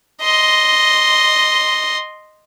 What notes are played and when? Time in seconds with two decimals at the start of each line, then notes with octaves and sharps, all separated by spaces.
0.22 D#5 C6